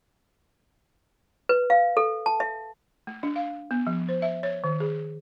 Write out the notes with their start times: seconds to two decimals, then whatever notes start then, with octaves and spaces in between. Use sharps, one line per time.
1.49 B4
1.70 F5
1.97 A4
2.26 A5
2.40 E5
3.07 A3
3.23 D4
3.36 F5
3.71 B3
3.87 F3
4.09 C5
4.22 E5
4.43 C#5
4.64 D#3
4.80 G#4